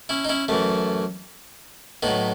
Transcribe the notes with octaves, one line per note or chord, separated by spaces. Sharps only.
C#4 E4
D#4
C#4 E4
F#2 E3 A3
A2 F#3 B3 D#4